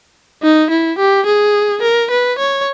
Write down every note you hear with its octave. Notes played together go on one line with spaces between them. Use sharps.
D#4
E4
G4
G#4
A#4
B4
C#5